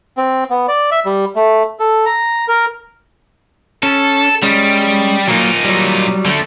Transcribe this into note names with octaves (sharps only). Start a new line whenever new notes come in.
C4
B3
D5
E5
G3
A3
A4
A#5
A#4
C#4 A4
G3 G#3 C#4
A#2 F#3 A#3 D#4
F#3 G3
D3 A3